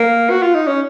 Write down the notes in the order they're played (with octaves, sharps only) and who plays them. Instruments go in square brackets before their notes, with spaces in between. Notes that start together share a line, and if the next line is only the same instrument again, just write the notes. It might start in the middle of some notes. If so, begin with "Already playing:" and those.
Already playing: [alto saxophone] A#3
F#4
F4
D#4
C#4